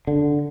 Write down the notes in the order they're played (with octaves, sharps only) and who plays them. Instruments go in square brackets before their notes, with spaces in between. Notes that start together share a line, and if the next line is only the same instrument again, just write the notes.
[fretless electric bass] D3